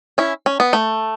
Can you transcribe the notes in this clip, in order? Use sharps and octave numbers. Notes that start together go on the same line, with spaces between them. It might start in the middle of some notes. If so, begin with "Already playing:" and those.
C#4 E4
C#4
B3
A3